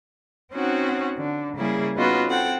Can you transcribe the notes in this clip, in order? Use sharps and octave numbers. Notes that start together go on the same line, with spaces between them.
C4 C#4 D#4 F#4 F#5
D3
C#3 G3 A#3 E4 G#4
B3 C#4 D#4 F4 F#4 B4
C4 A4 F#5 G5